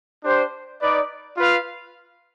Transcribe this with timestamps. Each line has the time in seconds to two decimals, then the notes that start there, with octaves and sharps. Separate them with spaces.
0.24 D4 G4 C5
0.80 D#4 B4 D5
1.37 F4 B4 F5